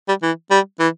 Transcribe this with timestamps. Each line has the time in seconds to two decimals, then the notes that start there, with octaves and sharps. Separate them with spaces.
0.08 G3
0.22 E3
0.51 G3
0.79 E3